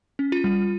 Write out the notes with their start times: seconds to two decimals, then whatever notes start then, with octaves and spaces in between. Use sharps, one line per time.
0.19 C#4
0.32 F4
0.44 G3